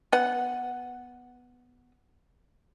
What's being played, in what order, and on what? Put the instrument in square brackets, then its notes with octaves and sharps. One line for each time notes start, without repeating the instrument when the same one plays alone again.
[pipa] B3 F#5